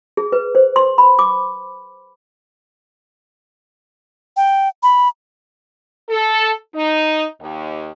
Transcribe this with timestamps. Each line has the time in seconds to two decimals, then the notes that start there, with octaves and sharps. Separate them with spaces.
0.17 G#4
0.32 B4
0.55 C5
0.76 C6
0.98 B5
1.19 D6
4.37 G5
4.83 B5
6.10 A4
6.75 D#4
7.41 D#2